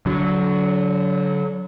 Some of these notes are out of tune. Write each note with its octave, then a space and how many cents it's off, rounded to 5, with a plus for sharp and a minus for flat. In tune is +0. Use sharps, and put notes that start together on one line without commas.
D3 -30 F#3 +0